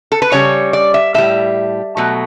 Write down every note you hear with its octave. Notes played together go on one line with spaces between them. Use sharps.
A4
B4
C#3 G3 C#5
D5
E5
A2 G3 E5
B2 F#3 A3